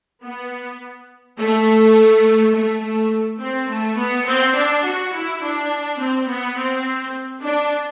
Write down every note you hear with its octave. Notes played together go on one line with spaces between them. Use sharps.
B3
A3
A3
A3
C4
A3
B3
C4
D4
F#4
E4
D4
C4
B3
C4
D4